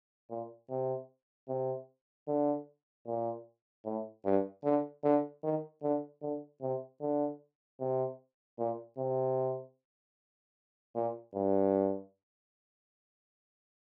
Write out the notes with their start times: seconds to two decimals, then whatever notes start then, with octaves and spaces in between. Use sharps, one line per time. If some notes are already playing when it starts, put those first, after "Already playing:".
0.30 A#2
0.70 C3
1.48 C3
2.28 D3
3.06 A#2
3.85 A2
4.25 G2
4.64 D3
5.04 D3
5.43 D#3
5.82 D3
6.22 D3
6.62 C3
7.01 D3
7.80 C3
8.59 A#2
8.98 C3
10.95 A#2
11.35 G2